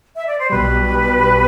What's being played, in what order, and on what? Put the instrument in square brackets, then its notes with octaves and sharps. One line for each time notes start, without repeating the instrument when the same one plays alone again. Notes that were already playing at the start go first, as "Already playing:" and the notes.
[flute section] E5
D5
C5
[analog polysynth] B1 B2 G3 [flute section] B4